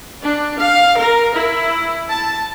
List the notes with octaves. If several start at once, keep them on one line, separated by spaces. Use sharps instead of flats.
D4
F5
A#4
E4
A5